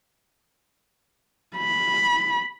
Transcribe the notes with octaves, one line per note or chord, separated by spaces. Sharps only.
B5